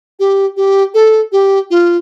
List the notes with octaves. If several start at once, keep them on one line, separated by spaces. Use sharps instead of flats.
G4
G4
A4
G4
F4